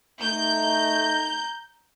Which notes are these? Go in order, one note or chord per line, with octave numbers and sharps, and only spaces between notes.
A3 D#4 A#5 G6